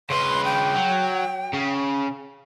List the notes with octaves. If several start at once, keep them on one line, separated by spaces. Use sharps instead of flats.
C#3 B4 C6
G5
F#3
C#3